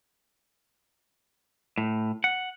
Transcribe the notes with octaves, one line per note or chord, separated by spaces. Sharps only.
A2
F#5